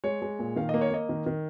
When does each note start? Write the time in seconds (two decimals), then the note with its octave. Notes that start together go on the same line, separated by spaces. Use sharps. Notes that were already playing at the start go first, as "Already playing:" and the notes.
0.04 G#3 C#5
0.22 G#3
0.39 A#2
0.56 D#3 F5
0.69 A#3 D#5
0.81 C#5
0.91 A#3 D#5
1.09 D#3
1.26 D#3